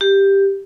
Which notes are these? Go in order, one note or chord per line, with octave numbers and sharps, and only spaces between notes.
G4